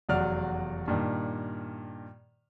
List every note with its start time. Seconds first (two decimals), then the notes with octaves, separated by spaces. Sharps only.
0.09 F1 E2 F#3 F#4 D5 F6
0.88 G2 A#2 D#3